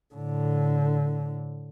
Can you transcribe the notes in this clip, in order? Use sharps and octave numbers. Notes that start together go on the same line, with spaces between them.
A2 D3